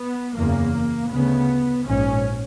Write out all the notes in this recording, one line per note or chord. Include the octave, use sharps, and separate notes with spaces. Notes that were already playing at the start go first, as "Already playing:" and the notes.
Already playing: B3
F#1 E2 C#3 A#3
D2 C#3 B3
A#1 G#2 C#4